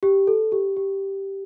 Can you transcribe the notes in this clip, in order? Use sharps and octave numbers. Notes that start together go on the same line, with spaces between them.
G4
A4
G4
G4